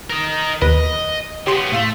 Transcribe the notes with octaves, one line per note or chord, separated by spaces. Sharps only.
A#4 D#5
D#2 B4 D#5
C#3 B3 G4 C6
A2 A3 F5 C6